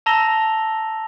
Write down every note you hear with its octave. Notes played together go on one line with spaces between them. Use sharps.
A5 A#5 E6 A#6 F7 G7